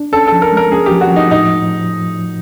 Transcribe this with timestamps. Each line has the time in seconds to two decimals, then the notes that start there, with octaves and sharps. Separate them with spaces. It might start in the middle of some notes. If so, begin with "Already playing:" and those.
Already playing: D4
0.12 C#4 A4
0.27 F3 A4
0.42 A#4
0.52 G#3 A#4
0.72 C#4 G#4
0.86 F3 G4
1.01 F#4
1.11 F3 D#4
1.31 A2 D#4